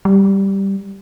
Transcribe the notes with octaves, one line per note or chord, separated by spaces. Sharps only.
G3